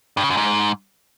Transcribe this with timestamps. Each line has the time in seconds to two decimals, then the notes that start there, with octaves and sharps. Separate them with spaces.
0.17 G2
0.24 C#3
0.30 F#2
0.37 G#2